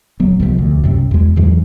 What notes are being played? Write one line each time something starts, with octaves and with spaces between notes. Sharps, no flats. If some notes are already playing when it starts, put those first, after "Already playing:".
D#1 F#3 B3
C2 C3 E3 F3
D2
C2 F#2 C3
E2 G#3
E2 G#2 E3 F#3